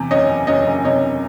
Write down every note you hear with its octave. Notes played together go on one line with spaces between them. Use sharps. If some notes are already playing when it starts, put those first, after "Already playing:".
Already playing: E2 C3
F#1 C#5 D#5
E2
F#1 C#5 D#5
F#1
C3 C#5 D#5